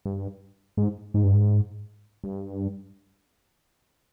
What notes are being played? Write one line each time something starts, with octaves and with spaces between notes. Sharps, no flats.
G2
G#2
G#2
G2
G#2
G2